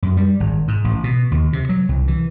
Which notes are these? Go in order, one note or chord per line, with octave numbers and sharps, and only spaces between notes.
F#2
G3
G#1
G#2
A1
B2
D#2
C3
F#3
C2
E3